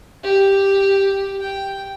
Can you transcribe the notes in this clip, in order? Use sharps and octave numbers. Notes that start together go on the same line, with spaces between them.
G4
G5